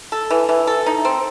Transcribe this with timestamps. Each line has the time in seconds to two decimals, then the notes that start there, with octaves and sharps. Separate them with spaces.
0.12 A4
0.30 E3
0.49 E3
0.67 A4
0.86 D#4
1.05 C4